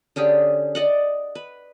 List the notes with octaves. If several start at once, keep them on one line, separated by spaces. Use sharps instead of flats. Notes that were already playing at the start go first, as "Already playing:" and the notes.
D3 C#4 G4 G#4
D5 D#5 F#5
B4